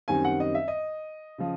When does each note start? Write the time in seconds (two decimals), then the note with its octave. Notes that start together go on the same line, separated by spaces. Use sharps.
0.08 F#2 D#3 G3 C4 G#5
0.24 F#5
0.40 D#5
0.55 E5
0.68 D#5
1.38 C#3 F3